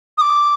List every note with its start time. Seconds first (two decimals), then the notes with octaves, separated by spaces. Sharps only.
0.18 D#6
0.21 D6